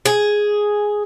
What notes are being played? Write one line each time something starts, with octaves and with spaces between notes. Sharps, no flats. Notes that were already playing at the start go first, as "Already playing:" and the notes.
G#4